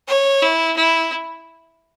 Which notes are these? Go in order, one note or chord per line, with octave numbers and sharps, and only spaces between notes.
C#5
E4
E4